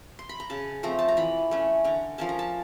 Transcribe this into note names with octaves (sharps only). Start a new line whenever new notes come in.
C6
B5
A#5
C#3 A5
F3 A3 C4 A#5
A5
A#5
E3 B5
A3 C#4
D3 A#5
F3 A#3 C#4 A5
A#5
A5